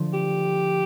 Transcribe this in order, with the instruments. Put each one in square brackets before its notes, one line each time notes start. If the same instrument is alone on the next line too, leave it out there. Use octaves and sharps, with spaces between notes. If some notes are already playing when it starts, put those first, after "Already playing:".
Already playing: [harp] D3 F3 A3
[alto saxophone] G4